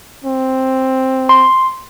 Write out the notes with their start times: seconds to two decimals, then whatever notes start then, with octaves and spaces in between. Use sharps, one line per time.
0.24 C4
1.29 C6